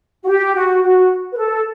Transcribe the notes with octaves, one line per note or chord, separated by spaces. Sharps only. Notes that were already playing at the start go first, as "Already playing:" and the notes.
F#4
G4
F#4
F#4
B4
A4